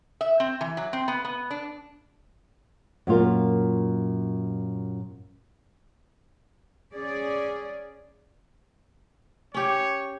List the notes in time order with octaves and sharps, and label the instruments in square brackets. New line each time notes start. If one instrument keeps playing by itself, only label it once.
[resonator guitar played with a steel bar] E5
C4
E3
F#3
C4
B3
B3
D4
[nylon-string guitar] F#2 A#2 F4 A#4
[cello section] C#4 G#4 D5
[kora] C#4 G4 [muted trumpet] C#5